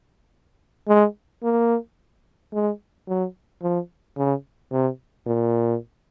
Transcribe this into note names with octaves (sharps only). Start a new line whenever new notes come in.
G#3
A#3
G#3
F#3
F3
C#3
C3
A#2